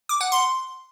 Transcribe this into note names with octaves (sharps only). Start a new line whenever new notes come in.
D6
F#5
C6